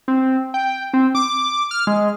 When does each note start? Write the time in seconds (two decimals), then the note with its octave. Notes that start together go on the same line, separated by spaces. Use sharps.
0.08 C4
0.54 G5
0.93 C4
1.15 D6
1.71 F6
1.87 G#3